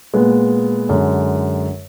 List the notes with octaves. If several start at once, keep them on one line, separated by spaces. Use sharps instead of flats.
A#2 G#3 B3
F#2 D3 G#3